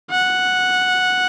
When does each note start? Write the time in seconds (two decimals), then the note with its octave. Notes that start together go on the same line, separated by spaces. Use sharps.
0.11 F#5